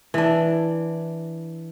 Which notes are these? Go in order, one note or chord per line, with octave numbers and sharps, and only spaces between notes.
E3 D4